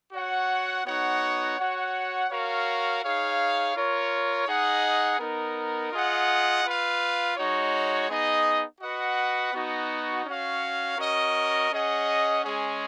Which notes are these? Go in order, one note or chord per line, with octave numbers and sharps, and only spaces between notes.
F#4 C#5 F#5
B3 D#4 F#4 C#5 F#5
F#4 C#5 F#5
F#4 A#4 C#5 F5
D#4 G#4 C#5 F5
F4 A#4 C#5
D#4 G#4 D#5 F#5
B3 D#4 A#4
F4 G#4 D#5 F#5
F4 B4 F5
G#3 D#4 F#4 C#5
B3 D#4 G#4 D#5
F#4 B4 D#5 F#5
B3 D#4 F#4
C#4 F#4 C#5 F5
C#4 F#4 A#4 D#5
C#4 G#4 D#5 F#5
G#3 C#4 G#4